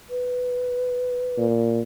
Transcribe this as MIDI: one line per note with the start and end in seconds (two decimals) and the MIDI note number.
0.10 1.46 71
1.38 1.81 46